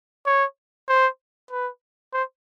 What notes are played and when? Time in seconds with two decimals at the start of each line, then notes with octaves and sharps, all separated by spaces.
0.26 C#5
0.88 C5
1.51 B4
2.13 C5